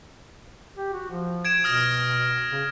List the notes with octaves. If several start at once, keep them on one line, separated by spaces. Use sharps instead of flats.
G4
F#4
F3
G#6 D7 E7
B2 D#6 F6 A#6
C#3